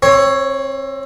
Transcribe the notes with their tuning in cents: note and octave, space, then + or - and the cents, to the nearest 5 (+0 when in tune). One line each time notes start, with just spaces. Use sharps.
C4 +30 C#5 +0